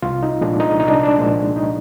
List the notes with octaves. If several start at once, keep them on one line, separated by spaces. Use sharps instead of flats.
C2 F4
D#4
A#2 F3 G#3 D4
D#4
C2 D#4
D4
D4
A#2 F3 G#3
D#4